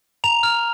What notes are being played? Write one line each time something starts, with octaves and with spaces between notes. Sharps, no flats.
A#5 F7
F6